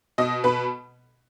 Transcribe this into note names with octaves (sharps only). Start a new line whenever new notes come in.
B2 D#5 D#6
B2 B4 B5